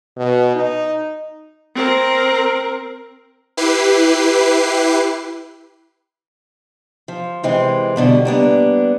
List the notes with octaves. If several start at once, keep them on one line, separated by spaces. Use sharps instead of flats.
B2
D#4
C4 A#4
E4 G4 B4 C7
F3
C3 E3 G#3 C4
G2 B2 D3 G3
G3 A#3 B3 D4